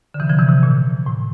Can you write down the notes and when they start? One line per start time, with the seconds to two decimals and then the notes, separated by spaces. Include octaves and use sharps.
0.14 D3
0.20 C3 E3
0.29 D3 F3
0.38 C3 E3
0.49 C3
0.63 A#2
1.06 A2